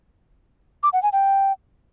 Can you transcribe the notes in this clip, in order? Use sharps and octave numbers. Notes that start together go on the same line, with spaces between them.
D6
F#5
G#5
G5